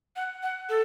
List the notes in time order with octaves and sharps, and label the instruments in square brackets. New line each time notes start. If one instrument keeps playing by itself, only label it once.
[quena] F#5
F#5
A4